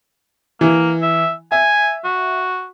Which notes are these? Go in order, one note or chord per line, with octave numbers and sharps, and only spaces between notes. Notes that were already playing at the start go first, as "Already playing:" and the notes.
E3 A#3 E4
E5
E5 G#5
F#4